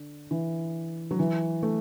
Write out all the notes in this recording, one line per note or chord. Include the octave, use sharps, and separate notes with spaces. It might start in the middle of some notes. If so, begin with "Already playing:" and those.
Already playing: D3
E3
F#3
E3
A3